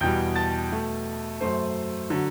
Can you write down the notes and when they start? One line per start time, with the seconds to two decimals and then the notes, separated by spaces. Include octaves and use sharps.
0.01 E2 B2 G3 G5 G6
0.36 A5 A6
0.71 B2 A3
1.41 F#2 F#3 A3 C5 C6
2.10 D3 F#3